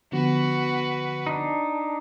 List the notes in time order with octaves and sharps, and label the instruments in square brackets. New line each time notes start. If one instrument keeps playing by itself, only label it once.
[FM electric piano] D3 F3 B3 [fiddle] F#4 B4
[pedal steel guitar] D4 D#4